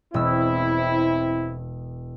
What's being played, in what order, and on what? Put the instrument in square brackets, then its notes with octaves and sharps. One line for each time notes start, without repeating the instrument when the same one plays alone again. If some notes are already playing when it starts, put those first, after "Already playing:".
[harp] E1 E6 [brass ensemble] C4 E4